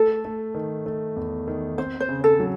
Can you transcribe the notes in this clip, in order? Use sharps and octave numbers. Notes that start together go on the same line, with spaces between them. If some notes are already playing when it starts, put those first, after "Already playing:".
Already playing: A3 A4
A3
D#3
A3
E2
D#3
C4 C5
C5
C#3
A4
F#3